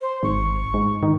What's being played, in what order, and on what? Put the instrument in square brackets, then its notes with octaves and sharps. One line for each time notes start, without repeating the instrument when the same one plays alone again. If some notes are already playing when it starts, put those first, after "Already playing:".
[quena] C5
[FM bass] G#1 [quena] C#6
[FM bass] G#2
D#3